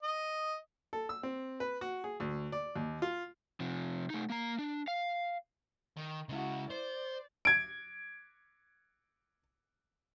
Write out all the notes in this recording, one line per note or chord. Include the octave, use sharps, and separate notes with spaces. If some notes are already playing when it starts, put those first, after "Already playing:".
D#5
A4
E6
C4
B4
F#4
G#4
D2
D5
D#2
F4
C3 F3
A3 D#4
A#3 A#5
D4
F5
D#3
C#3 G#3 E4 F#4
C5 D5
G#6 D7